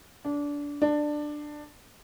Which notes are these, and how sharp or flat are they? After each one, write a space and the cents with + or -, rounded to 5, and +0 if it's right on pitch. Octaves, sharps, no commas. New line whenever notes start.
D4 -20
D4 +15